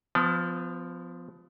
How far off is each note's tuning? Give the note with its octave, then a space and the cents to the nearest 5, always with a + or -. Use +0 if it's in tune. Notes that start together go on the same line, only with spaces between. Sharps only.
F3 +0 B3 +35